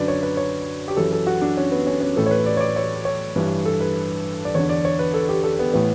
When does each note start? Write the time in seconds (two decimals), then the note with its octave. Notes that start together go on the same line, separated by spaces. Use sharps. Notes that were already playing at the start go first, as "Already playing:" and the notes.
Already playing: F#2 D3 B4 D5
0.08 C#5
0.23 B4
0.37 C#5
0.88 G4
0.97 F#2 E3 A4
1.13 A4
1.27 F#4
1.42 D4
1.57 C#4
1.71 B3
1.87 C#4
2.01 C#4
2.16 A2 E3 A4
2.26 C#5
2.31 B4
2.46 D5
2.57 C#5
2.60 D5
2.76 C#5
3.05 C#5
3.36 G2 E3
3.65 A4
3.81 B4
4.45 D5
4.54 E2 D3 C#5
4.69 D5
4.85 C#5
4.99 B4
5.14 A4
5.29 G4
5.44 A4
5.59 B3
5.73 A2 E3 B3